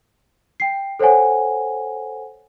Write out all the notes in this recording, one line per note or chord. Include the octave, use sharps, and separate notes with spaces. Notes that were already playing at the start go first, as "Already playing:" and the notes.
G5 C7
A4 C5 C#5 F#5 G#5